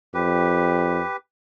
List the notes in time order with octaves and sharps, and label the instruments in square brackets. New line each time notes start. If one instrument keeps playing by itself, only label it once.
[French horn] F2 [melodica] G4 B4